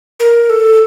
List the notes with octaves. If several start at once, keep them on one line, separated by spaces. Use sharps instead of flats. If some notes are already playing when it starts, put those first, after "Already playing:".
A#4
A4